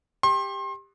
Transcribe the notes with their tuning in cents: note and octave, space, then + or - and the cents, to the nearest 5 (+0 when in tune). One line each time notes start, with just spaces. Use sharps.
G4 +15 C6 +35